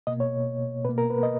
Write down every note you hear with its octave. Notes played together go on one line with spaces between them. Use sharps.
B2 A#3 D#5
C#5
B2 A#3 B4
A#4
B4
D#5